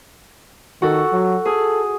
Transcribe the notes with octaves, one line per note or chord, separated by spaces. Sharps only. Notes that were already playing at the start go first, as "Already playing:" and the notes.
D#3 F#4 A4
F#3
G#4 A4